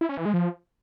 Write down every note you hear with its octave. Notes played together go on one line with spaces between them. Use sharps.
E4
C#4
E3
G#3
F3